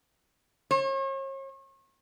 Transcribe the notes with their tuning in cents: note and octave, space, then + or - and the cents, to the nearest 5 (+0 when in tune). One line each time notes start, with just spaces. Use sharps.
C#5 -40